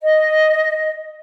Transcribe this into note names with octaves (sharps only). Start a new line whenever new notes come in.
D#5